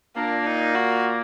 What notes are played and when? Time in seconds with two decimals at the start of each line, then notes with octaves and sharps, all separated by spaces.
0.16 A#2 A#3 D4
0.46 D#4
0.75 F#4